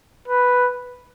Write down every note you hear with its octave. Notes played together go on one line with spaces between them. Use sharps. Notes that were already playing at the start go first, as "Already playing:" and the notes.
B4